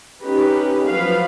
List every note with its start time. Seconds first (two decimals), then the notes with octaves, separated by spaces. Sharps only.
0.23 C#4 D#4 G4 B4
0.86 F3 F#3 B4 F5